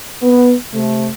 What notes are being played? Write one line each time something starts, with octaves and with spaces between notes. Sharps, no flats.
B3
C3 A3